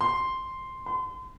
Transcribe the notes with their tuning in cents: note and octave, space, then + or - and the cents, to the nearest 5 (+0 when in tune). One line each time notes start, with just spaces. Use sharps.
C6 +0
C6 -35